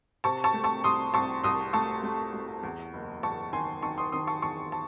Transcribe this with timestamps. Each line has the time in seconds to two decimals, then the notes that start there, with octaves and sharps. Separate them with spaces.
0.24 C3 A5 C#6
0.44 A5 C#6
0.54 A3
0.64 A5 C#6
0.84 C2 C6 D#6
1.14 C2 A5 C#6
1.44 C2 C6 D#6
1.73 A3 A5 C#6
2.03 A3
2.34 A3
2.63 E2
2.93 F#1
3.23 E2 A5 C#6
3.53 D#3 G#5 C6
3.83 D#3 A5 C#6
3.98 C6 D#6
4.12 D#3 C6 D#6
4.27 A5 C#6
4.42 E2 A5 C#6
4.72 A5